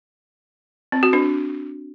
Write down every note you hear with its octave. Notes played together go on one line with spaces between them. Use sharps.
C4
F#4
D4